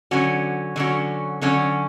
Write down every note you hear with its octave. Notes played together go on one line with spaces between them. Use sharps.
D3 F#3 C#4 F#4
D3 F#3 C#4 F#4
D3 F#3 C#4 F#4